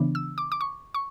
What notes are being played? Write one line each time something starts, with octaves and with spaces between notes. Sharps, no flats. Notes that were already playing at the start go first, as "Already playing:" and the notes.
Already playing: C#3 E3 B3 D4
E6
D6
D6
C#6
C#6